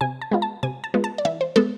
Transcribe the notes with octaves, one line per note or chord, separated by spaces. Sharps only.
C3 G#5
A5
G#3 B3 F4
A5
C3 G#5
A5
G#3 B3 F4
A5
D5
E3 E5
C5
G#3 B3 A4